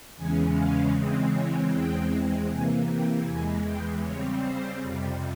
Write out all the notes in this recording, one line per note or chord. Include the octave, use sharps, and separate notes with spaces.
E2 C#3 E3 G#3 C#4 G#5
F5
C#3 E3 G#3 C4
C#5
E2 E3 G#3 C4 G5
C3 E3 A#3 G#5
G5
E2 E3 G#3 G#5
G5
C#3 G3 C4 C#5
C5
F2 C3 G3